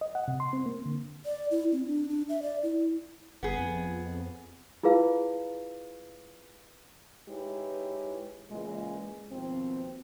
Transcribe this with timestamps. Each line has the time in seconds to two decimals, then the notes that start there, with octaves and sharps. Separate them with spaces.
0.01 D#5
0.15 F#5
0.28 C3
0.40 C6
0.53 C4
0.66 A#3
0.86 D3
1.25 D5
1.51 E4
1.72 C4
1.87 D4
2.09 D4
2.29 E5
2.42 D5
2.63 E4
3.43 G1 B3 G#4
3.57 F2
4.83 E4 F4 G#4 B4 F5
7.29 G#3 D#4 E4 G4 B4 C#5
8.50 A#2 C#3 E3 G#3
9.31 D#2 B2 F3 C4